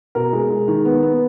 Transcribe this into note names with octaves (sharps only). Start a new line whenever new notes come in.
B2 A#4
G#3
G#3
D#3
B3
B3